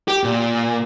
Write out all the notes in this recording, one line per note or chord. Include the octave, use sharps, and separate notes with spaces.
G4
A#2